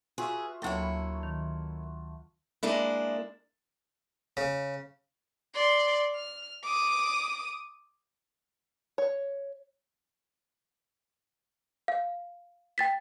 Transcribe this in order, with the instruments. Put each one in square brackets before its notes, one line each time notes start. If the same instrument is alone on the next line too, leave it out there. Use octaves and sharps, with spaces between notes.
[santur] F4 F#4 E5 [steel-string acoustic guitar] G#4 B4
[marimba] D2 F#3 G5 [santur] A3 [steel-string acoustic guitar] A#3 E4 C#5
[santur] B5
[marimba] D#3
[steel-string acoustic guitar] G#3 A#3 D4 E4
[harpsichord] C#3
[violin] D5 C6
F6
D6 D#6
[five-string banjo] C#5
[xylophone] F5
G5 A6 B6